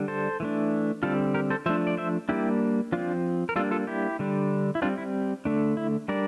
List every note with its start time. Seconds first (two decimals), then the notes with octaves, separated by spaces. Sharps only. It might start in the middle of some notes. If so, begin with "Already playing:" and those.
Already playing: D3 G3 D4
0.08 A4 C5
0.40 E3 A3 D4
1.03 D3 G3 C4 F4 A4
1.34 G4 A#4
1.50 A4 C5
1.66 F3 A3 D4 C5 E5
1.87 D5
1.97 C5 E5
2.29 G3 A#3 D4 E4 G4
2.92 F3 C4 D4 F4
3.49 A#4
3.56 G3 A#3 D4 F4 A4
3.71 F4 A4
3.87 E4 G4
4.19 D3 G3 D4
4.75 E4
4.82 G3 C4 D4 F4
4.98 E4
5.45 D3 A3 D4
5.77 E4
6.08 G3 D4 A#4 D5